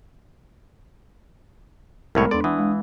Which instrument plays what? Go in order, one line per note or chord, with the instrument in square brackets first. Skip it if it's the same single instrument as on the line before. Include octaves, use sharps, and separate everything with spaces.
[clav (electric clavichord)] C2 A2 C#5 [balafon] G#3 B3 B5 [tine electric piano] A#4
[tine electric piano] E2 B3 A4 [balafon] D4 C6 [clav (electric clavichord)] D5
[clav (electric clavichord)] E3 [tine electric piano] D4 D#6 [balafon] F#5
[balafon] G#3